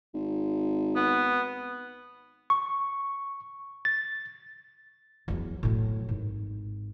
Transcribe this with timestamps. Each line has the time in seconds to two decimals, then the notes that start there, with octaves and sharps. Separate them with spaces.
0.14 G#1
0.96 B3
2.50 C#6
3.85 A6
5.28 E2 F#3
5.63 A2 F#3
6.09 G#1